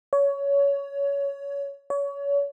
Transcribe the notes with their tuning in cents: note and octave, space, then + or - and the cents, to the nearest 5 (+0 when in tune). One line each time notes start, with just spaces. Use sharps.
C#5 +20
C#5 +30